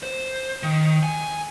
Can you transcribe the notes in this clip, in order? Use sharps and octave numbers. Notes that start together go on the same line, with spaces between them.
C5
D#3
G#5